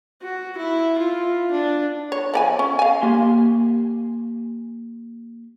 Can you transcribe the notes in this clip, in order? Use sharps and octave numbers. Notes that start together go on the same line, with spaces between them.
F#4
E4
F4
D4
C#5
F3 D5 G#5
C#4
F5 G#5
A#3 G4 G#5 C6